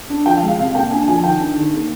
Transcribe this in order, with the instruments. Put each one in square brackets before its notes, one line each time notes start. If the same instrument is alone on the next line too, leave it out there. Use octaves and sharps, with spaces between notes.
[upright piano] D4
F3 G5
F5
G#3
F5
C3 F5
A#3 G5
D4 G#5
F3 G#5
D#3 G5
D4
D#3
A#3